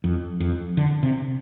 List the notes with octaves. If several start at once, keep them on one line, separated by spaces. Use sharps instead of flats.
F2
F2
D3
C3